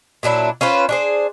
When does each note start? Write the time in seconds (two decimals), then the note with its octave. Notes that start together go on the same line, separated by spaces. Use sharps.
0.23 A#2 F#3 D4 E4
0.61 C#4 F4 B4 C5
0.89 D4 G#4 C5